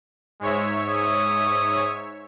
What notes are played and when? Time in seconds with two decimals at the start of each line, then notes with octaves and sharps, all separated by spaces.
0.41 G#2 G#3 C#5 E5
0.88 D#6